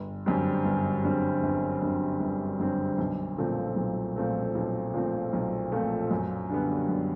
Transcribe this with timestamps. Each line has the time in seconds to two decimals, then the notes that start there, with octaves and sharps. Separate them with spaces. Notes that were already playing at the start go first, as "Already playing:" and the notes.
Already playing: G1
0.26 F#2 D3 G3 C4
0.65 G1
1.04 F#2 D3 G3 C4
1.43 G1
1.82 F#2 D3 G3 C4
2.20 G1
2.60 F#2 D3 G3 C4
2.98 B1
3.38 A#2 F3 A3 C4
3.76 B1
4.16 A#2 F3 A3 C4
4.55 B1
4.94 A#2 F3 A3 C4
5.33 B1
5.72 A#2 F3 A3 C4
6.11 F#2
6.50 D3 G3 B3
6.89 F#2